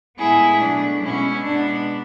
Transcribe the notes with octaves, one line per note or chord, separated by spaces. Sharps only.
A2 G#3 B3 E4 G#4
B2 F#3 A3 D4
B2 G#3 B3 C#4 E4
B2 G#3 B3 D4